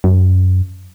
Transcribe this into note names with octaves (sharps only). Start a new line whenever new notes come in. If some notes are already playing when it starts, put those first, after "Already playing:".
F#2